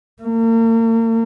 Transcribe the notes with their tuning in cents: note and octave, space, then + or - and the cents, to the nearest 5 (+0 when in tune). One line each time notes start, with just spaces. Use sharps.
A#3 -40